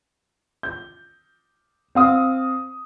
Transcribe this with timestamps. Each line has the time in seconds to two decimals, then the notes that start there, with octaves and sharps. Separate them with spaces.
0.63 G6
1.95 C4 F5 D#6